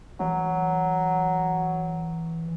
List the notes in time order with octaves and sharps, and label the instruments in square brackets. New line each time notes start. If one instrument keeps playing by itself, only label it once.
[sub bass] E3 [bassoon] F#3